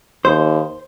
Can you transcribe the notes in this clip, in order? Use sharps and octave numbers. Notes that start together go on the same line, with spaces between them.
D#2 C5